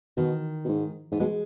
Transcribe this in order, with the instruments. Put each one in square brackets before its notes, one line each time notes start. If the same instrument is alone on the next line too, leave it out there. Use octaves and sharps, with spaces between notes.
[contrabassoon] B2 [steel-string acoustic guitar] D#3
[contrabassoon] B2
G#2
[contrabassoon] G#2 [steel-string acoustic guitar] B3
[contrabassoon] B2 [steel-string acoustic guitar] G#3